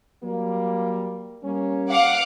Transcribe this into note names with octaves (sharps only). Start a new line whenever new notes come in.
F#3 G3 A#3
G3 A#3 C#4
F5 F#5 D6